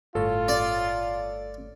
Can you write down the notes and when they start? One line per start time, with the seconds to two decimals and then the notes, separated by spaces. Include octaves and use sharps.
0.15 G1 A2 F4 A4 C#5
0.48 D5